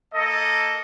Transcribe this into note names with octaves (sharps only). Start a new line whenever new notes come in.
A#3 A4 D#5